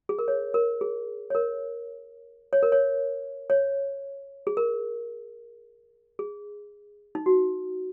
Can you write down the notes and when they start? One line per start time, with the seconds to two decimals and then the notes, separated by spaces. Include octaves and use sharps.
0.09 G#4
0.19 A#4
0.28 C#5
0.54 A#4
0.81 G#4
1.30 C#5
1.35 A#4
2.53 C#5
2.63 A#4
2.72 C#5
3.50 C#5
4.47 G#4
4.57 A#4
6.19 G#4
7.15 D#4
7.26 F#4